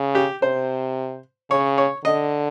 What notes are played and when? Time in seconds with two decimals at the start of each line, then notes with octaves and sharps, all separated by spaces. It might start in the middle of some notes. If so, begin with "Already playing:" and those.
Already playing: C#3
0.15 G4
0.42 C3 C5
1.50 C#3 C#5
1.78 C#5
2.05 D3 D#5